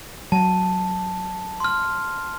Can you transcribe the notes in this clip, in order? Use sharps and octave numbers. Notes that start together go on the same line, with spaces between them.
F#3 A5
C6 F6